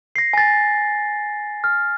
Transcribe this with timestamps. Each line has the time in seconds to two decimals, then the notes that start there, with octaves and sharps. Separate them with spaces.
0.16 A#6 C7
0.33 G#5 A6
1.64 F6